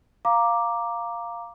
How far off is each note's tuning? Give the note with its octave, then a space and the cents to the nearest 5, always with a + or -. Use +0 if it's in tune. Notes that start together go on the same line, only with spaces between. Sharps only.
F5 +0 A#5 +0 D6 +0